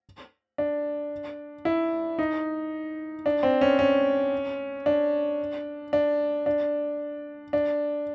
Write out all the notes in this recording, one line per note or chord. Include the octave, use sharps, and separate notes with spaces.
D4
E4
D#4
D4
C4
C#4
C#4
D4
D4
D4
D4